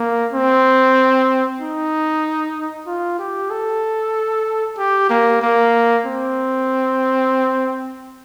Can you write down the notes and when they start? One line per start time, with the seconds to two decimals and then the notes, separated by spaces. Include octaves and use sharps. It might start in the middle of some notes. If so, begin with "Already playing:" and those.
Already playing: A#3
0.33 C4
1.60 D#4
2.87 F4
3.19 G4
3.50 A4
4.78 G4
5.10 A#3
5.42 A#3
6.06 C4